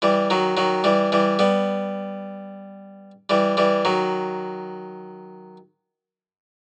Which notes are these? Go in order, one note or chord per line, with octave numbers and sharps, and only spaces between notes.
E3 G3
D#3 F#3
D#3 F#3
E3 G3
E3 G3
G3 B3
E3 G3
E3 G3
D#3 F#3